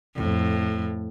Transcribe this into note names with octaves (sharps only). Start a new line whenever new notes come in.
F2 A2